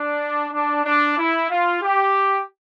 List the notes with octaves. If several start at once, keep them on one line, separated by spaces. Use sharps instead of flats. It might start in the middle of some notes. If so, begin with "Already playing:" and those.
Already playing: D4
D4
D4
E4
F4
G4